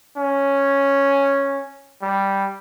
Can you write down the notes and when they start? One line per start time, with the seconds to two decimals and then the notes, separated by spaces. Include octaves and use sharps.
0.17 C#4
2.02 G3